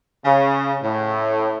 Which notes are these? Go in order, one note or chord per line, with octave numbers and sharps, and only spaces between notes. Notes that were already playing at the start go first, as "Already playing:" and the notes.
C#3
A2